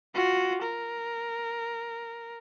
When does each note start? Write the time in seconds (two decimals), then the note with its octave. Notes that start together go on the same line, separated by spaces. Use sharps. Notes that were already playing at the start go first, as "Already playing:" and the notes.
0.15 F4 F#4
0.63 A#4